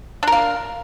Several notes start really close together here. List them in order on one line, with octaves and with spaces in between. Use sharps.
D4 A#4 F5